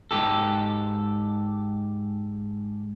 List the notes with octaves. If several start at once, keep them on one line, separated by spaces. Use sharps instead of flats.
G#2 B2 G4 A4